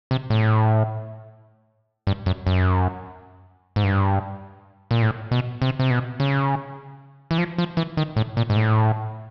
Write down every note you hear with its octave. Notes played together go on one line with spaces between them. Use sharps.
C3
A2
G2
F#2
F#2
G#2
G2
A#2
A2
B2
C3
C3
B2
C#3
E3
F3
F3
E3
D#3
A2
A#2
G#2
A2